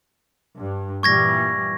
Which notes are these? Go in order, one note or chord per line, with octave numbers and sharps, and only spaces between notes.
G2
A#2 E3 G3 C#6 G#6 A#6